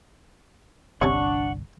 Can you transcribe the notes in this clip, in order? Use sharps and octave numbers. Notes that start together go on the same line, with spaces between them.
G1 C2 C3 C#4 D4 F#5 A5 C#6